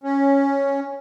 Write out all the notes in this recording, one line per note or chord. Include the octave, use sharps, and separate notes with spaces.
C#4